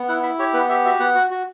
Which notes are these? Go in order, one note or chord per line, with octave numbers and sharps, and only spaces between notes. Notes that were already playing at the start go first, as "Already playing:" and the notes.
Already playing: B3
E4 F#5
E4 E5
G4 C#5
B3 B4
G4 E5
F#4 E5
B3 F#5
F#4
F#4